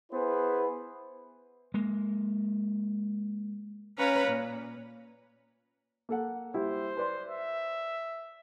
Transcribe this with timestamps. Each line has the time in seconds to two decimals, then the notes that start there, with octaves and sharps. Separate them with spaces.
0.11 B3 E4 G#4 B4 C5
1.74 G#3 A#3
3.98 C#4 B4 C#5 F5 A#5 B5
4.28 A#2
6.09 A#3 A4 F#5
6.54 G3 E4 G4 C5
6.97 B4 D5 C6
7.29 E5